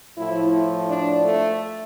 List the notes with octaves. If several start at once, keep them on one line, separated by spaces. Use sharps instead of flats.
A2 F3 E4
D4
A3